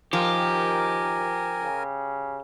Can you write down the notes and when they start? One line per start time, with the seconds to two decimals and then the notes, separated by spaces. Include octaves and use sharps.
0.13 D#3 F3 G4 A#4 G#5
1.62 C#3